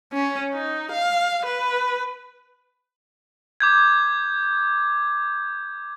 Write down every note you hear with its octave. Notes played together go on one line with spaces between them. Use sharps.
C#4
D#4
F5
B4
D6 G6 G#6